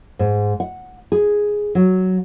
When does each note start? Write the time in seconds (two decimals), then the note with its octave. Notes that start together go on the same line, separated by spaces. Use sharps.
0.19 G#2
0.60 F#5
1.12 G#4
1.75 F#3